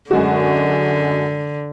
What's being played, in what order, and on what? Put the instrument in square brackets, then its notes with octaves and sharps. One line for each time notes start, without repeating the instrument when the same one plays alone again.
[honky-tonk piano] F#2 G#3 F#4 [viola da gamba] D3